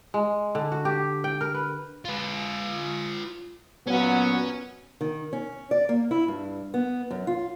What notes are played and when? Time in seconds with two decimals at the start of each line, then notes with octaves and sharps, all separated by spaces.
0.14 G#3
0.55 D3
0.72 F#4
0.85 G4
1.24 G5
1.41 A#4
1.54 B4
2.05 F4 B4
3.87 A#2 F#3 B3 C#4
5.01 D#3
5.33 C#4
5.71 D5
5.89 A#3
6.11 E4
6.28 G2
6.74 B3
7.11 F#2
7.27 F4